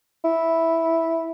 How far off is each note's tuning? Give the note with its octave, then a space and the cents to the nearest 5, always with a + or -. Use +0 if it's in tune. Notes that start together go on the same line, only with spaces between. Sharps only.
E4 -5